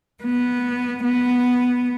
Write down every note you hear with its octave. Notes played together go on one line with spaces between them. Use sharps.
B3
B3